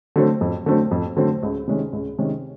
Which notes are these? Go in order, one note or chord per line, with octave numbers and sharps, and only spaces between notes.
D3 F#3 A3 C4
F2
D3 F#3 A3 C4
F2
D3 F#3 A3 C4
C#2
C3 D#3 G#3 C#4
C#2
C3 D#3 G#3 C#4